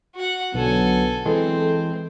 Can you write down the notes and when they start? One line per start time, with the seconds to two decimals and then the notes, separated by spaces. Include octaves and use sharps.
0.15 F#4 F#5
0.54 B1 D3 F#3 B3 A4 G#5
1.26 E3 G#3 C4 A4